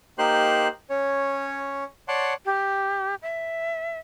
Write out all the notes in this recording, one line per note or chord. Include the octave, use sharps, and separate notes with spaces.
A#3 D#4 G4 C5 C6 F#6
C#4 C#5
C#5 D5 F#5 A5 C6
G4
E5